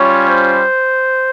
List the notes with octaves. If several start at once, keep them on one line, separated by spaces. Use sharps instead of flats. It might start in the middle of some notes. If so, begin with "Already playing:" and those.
Already playing: G3 C#4 F4 C#5
C5